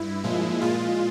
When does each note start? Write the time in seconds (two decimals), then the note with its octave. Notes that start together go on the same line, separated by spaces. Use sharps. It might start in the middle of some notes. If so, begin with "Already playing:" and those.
Already playing: G2 E4
0.24 A#2 F3 G#3
0.61 A#2 G#3 F4